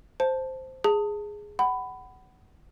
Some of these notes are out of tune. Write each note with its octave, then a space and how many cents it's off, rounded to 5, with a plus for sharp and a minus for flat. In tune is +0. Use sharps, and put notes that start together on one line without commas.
C5 +0 A5 +0
G#4 +0 A5 +25
F#5 +20 B5 +15